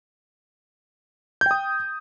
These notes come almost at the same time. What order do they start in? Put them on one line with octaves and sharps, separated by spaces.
G6 G5 D#6